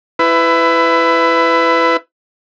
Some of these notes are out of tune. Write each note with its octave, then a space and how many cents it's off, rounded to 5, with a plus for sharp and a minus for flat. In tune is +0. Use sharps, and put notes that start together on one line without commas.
E4 +10 B4 +25